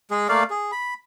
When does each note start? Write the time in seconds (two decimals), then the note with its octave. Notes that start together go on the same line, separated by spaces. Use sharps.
0.11 G#3 G#4
0.29 A3 A#3 D5 F5
0.50 G#4
0.72 B5